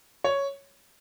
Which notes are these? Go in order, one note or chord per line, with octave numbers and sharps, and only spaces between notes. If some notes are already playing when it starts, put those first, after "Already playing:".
C#5